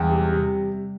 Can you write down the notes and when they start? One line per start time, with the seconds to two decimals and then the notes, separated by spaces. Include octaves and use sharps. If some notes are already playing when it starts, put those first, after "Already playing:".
Already playing: E2 G3
0.10 C3
0.31 C3